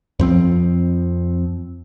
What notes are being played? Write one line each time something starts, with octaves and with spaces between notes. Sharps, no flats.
F2 F3 C4